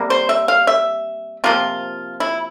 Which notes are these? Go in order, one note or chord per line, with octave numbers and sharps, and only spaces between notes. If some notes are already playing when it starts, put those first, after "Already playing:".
Already playing: C3 G3 A#3
C5
E5
F5
E5
C3 F3 A#3 F4
E4